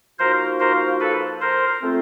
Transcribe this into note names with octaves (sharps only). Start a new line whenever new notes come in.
F3 A#3 D#4 F#4 A#4 C5
A#4 C5
A4 B4
A#4 C5
A3 C4 F4